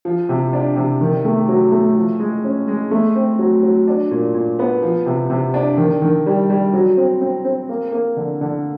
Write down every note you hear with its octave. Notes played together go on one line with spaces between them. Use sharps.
F3
C3
D4
C3
D#3
A3
F#3
A3
F3
G#3
C#4
G#3
A3
C4
F#3
F#3
D4
A#2
A#2
B3
F3
C3
C3
D4
D#3
D#3
G3
G3
F#3
C4
C4
C4
A#3
A#3
D3
D3